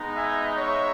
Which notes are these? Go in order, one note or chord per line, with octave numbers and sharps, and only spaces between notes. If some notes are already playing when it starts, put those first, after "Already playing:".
Already playing: G#3 B3 D#4
E5 G#5
C#5 E5